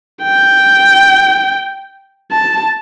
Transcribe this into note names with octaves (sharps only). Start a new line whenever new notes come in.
G5
A5